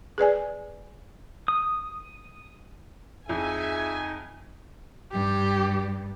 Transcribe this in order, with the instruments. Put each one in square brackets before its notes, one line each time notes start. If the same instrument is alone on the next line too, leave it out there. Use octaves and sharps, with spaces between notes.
[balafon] G#4 B4 D5 G#5
[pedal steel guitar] D#6
[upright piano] F2 [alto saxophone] D#4 [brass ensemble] F4 G#4 E5 [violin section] G#5
[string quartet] G2 [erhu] G4